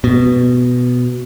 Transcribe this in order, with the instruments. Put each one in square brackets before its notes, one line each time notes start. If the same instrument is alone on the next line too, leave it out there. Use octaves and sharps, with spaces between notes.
[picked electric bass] B2